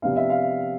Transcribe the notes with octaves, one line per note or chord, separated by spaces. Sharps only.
C3 F3 B3 D4 F5
E5
F5